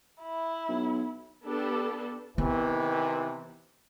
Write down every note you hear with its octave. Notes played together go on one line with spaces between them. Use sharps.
E4
B1
B3 D4 G4 A4
C3 D#3 E3 B3